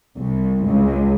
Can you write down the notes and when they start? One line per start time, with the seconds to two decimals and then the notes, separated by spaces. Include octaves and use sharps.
0.18 C2
0.66 C#2